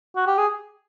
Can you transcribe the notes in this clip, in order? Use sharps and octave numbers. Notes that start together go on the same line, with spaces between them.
F#4
G4
G#4